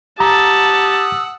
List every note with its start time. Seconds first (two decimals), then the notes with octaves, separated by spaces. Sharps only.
0.20 G4 F#5 A5 A#5 D#6 E6